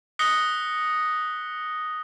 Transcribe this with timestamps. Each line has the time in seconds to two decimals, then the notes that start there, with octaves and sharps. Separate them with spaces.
0.19 D#6 F#6 A#6 B6 C#7 G7